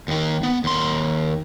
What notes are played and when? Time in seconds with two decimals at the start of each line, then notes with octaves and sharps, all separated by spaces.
0.08 D#2 D#3
0.43 B3
0.64 D#2 C6